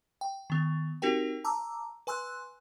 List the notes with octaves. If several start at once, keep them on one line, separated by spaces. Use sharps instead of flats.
G5
D#3 B3
C4 D#4 F#4 G4 A#4 G5
A5 A#5 D6 E6
B4 G#5 C6 E6 F#6